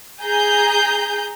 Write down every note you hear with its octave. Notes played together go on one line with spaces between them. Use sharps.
G#4 G#5 A#5 G6